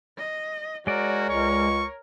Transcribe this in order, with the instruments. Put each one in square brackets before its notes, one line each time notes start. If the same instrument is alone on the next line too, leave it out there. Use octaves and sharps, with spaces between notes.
[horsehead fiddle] D#5
[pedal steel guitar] G#3 D5 [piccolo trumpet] F#4 [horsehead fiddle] A#4 C#5
[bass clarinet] C#2 [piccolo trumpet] C#6